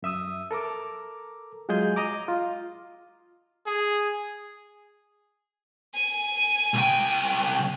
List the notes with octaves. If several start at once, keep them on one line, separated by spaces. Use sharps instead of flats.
F#2 E5 D#6 E6
A4 A#4 A#5 D6
F#3 G#3 F4 G#4 D#5 G6
D#5 A#5 D6
F4
G#4
G#5
C2 G5